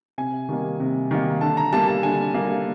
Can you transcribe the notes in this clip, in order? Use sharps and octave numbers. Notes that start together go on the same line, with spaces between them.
C3 G#5
D#3 G3 A#3
C3
D#3 G3 A#3
D3 A5
A#5
G3 A#3 A5
A5
D3 G#5
G3 A#3